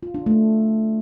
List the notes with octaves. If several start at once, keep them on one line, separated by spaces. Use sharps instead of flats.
F4
D4
A3